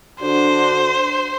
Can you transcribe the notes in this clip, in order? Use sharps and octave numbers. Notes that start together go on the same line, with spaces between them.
D3 D4 F#4 C5